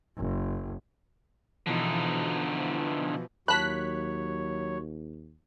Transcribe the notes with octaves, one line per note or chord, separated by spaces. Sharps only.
F#1
B2 D3 E3 F3 D#4
D#2 F#3 F4 C#5 A5 B5 F#6 B6